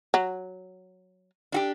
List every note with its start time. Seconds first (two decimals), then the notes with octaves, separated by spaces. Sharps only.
0.14 F#3
1.52 D4 F#4 G4